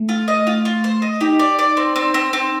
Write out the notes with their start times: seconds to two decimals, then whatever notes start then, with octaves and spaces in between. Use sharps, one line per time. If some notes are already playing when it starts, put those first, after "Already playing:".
Already playing: A3
0.09 F4
0.28 D#5
0.47 F4
0.65 F4
0.84 C5
1.02 D#5
1.21 D#4 G4
1.39 D5
1.59 D5
1.77 C4
1.96 C4
2.14 C4
2.33 C4